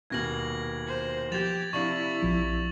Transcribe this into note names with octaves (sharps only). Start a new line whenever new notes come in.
D#1 B2 A#3 G#6 A#6 F#7
C5
F3 G4 G#6 A6 E7 F7
C3 D4 E4 F5 C#6 F#7
A#1 F3